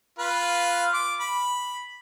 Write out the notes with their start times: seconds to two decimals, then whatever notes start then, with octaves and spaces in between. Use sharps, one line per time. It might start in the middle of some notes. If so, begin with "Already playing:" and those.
0.19 F4 B4 F5
0.94 D6
1.20 B5